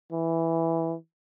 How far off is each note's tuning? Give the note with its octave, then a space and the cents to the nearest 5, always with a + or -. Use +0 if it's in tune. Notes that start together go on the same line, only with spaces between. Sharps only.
E3 +0